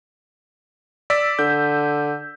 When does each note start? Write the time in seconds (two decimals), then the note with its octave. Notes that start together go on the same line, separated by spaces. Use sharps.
1.10 D5 E6 B6
1.39 D3 G6